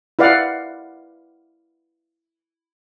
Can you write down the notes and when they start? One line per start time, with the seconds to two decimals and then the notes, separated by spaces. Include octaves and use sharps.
0.19 E4 B4 D5 F5 F#5